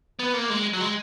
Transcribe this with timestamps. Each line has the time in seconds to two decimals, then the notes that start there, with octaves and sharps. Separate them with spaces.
0.19 B3
0.34 A#3
0.50 G#3
0.73 F#3
0.81 G#3